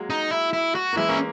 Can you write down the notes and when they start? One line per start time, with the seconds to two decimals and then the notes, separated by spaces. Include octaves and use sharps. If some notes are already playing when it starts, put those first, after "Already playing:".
Already playing: F#3 G#3 A#3
0.10 D#4
0.31 E4
0.53 E4
0.75 F#4
0.93 A#3
0.97 E3 G#3 E4
1.09 A#3 C#4